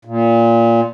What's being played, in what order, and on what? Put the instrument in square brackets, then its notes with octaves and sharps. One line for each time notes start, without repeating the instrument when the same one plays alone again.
[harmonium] A#2